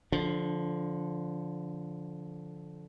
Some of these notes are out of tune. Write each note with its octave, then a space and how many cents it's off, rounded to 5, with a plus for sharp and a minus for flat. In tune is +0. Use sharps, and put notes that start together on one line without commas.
D3 -15 F3 +0 D4 +20